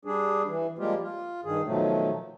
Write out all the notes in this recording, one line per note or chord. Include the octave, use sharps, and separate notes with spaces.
G3 D4 G#4
E3
F3 G3 G#3 A#3 F4 G4
F4
G2 D#3 G#4
B2 D#3 F3 F#3 A3